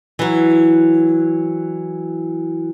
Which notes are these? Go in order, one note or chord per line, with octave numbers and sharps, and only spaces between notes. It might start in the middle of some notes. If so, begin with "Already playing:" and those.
E3 F#3